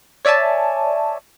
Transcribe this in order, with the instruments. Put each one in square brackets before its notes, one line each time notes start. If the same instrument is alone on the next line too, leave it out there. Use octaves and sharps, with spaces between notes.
[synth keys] C#5 D5 E5 G#5 A5